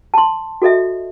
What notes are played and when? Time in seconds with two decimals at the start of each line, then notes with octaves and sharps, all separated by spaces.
0.14 A5 C6
0.62 F#4 A4 D#5 E5